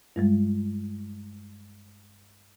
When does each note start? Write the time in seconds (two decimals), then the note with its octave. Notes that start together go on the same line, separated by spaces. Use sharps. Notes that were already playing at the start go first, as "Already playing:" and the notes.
0.16 G2 G3 G#3